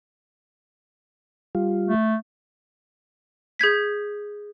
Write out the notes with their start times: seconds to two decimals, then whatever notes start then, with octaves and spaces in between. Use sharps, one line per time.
1.55 G3 F4
1.88 A3
3.59 G#4 G6 G#6 B6